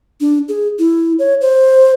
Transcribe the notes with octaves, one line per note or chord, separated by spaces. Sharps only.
D4
G#4
E4
C#5
C5